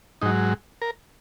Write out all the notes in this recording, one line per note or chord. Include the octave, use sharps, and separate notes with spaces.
G#2 F#3 D#4
A#4